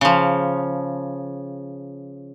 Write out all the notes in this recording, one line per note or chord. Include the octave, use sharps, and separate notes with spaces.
C#3 F3